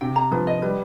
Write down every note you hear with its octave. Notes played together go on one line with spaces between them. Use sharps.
C3 G5
A#5
F3 B4
D#5
G3 B4